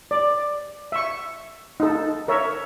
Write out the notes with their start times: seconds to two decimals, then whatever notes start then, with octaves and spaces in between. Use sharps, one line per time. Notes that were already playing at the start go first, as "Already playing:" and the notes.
0.11 D5
0.92 E5 C#6
1.80 D#4 A4
2.28 A#4 C#5 E5